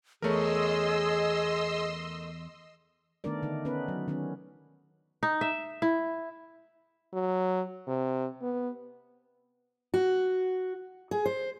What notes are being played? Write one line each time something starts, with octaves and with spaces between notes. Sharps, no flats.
E2 A3 G#4 A#4 C#5 D#5 C6 E6
D#3 A3 B3 D4 A#4 D5
D3 D#3 D#4
B3 C#4 D#4 B4
F#3
D#3 B3 C#4
D#4
E5
E4
F#3
C3
B3
F#4
G#4
C5